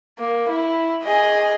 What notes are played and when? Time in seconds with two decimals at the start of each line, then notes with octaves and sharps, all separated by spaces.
0.19 A#3
0.50 E4
1.04 G#4 D#5